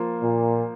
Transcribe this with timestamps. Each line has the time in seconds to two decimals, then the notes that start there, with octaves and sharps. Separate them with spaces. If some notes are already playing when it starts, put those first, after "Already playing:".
Already playing: F3 A#3 F4 C5
0.23 A#2